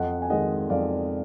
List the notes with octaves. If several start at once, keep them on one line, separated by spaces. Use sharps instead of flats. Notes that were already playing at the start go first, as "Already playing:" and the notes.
Already playing: F2 D#5 F#5
G#5
D#3 G#3 D#5 F#5
F2 D5 F5